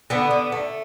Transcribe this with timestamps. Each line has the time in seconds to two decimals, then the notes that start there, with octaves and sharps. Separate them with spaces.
0.10 D3 B3
0.31 D3
0.52 A3